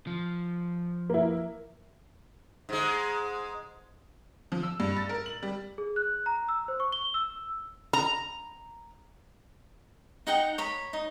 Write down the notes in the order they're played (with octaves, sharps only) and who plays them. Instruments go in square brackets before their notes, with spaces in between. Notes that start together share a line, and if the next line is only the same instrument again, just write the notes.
[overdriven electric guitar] F3
[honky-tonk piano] A#3 E4
[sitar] G#2 G#3
[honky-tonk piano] F3
E6
G2
A6
A#4
F#7
G3
[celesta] G#4
F#6
A#5
E6
C5
C#6
G7
E6
[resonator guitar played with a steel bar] A#5
[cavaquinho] D#4 F#5 G5 A#5
C#5 A#5 B5
D#4